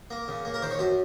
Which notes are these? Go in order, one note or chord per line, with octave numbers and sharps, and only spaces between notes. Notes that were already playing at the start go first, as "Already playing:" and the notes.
A#3
C#3
A#3
A#4
D#3 C5
C#5
F#2 C5